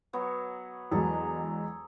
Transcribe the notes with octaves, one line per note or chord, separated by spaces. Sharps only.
F#3 B3 C#5
E2 F#3 G#3 G#4 A4 A#5